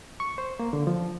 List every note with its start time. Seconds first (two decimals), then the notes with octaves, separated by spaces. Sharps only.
0.20 C#6
0.38 C5
0.59 A#3
0.73 D3
0.87 F3